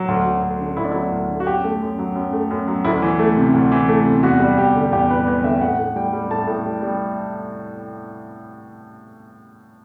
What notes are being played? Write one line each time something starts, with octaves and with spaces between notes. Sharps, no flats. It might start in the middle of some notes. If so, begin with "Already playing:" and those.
Already playing: F#3
D2
F#3
D2
D3
D2 E4
D4
F#3 E4
D2
D3
F#4
F#2 G4
A3
F#2
F#3
F#2
A3
F#2
F#3
D2 E4
E3
A3
C3
D2
E3
A3
C3
E2 F#4
G3
E2 G4
D3
E2 G4
G3 B4
E2 B4
D3 E5
A2 F#5
A2
G3 G5
G3
A2 A5
A2
G3
G3